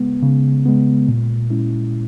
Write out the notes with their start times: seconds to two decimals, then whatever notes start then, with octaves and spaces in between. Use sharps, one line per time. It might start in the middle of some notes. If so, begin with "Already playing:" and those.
Already playing: C#3 G#3 B3
0.23 C#3
0.66 G#3 B3
1.08 A#2
1.50 G#3 C#4 E4